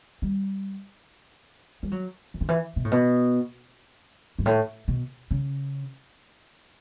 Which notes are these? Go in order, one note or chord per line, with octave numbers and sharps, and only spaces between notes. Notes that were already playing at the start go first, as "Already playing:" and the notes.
G3
G3
F#3
E3
D3
E3
B2
A2
B2
G2
A2
B2
C#3